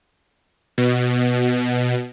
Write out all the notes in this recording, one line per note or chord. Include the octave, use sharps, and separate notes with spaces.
B2